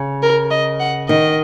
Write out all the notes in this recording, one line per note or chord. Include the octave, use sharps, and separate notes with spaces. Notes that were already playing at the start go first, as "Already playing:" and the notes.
Already playing: C#3
A#4
D#5
F#5
D#3 D#5